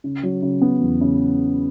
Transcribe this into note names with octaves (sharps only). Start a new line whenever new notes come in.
C#3
F#3
C#3
B3
E2
C#3